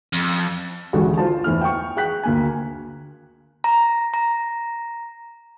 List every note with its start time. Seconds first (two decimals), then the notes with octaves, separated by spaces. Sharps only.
0.13 F2
0.93 A1 D2 G#3 F#4 A4
1.18 F4 C5 A5
1.44 E2 E3 A3 F6
1.61 G5 C#6
1.96 G#4 G5 F#6 B6
2.23 D2 A#3 G#5
3.64 A#5
4.14 A#5